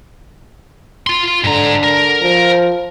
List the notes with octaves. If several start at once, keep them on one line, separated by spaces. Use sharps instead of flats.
F4 C6
G#2 D3 A#5
A#4
F3